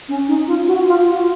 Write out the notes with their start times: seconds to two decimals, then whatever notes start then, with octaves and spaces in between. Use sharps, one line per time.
0.09 C#4
0.28 D#4
0.48 F4
0.68 F#4
0.88 F4
1.07 F#4